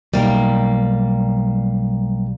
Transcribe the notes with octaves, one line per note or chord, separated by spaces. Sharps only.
B1 G3 A#3